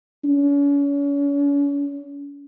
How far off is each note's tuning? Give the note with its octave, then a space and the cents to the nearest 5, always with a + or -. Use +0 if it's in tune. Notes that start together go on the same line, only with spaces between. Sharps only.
C#4 +40